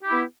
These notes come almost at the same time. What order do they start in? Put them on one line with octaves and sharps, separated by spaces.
G4 E4 B3